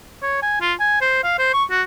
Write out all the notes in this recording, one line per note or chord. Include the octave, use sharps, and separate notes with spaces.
C#5
G#5
F4
G#5
C5
F5
C5
C#6
F#4